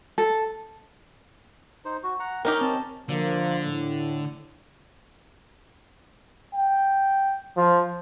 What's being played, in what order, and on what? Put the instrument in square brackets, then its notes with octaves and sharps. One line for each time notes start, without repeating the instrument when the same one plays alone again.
[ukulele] A4
[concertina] D#4 C5
F#4
F#5 A#5
[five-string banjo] C#4 D#4 G4 [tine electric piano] A#4 [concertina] F6
[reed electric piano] C4 [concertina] A5
[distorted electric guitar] D3 [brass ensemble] F3 A#3
[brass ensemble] A2
[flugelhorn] G5
F3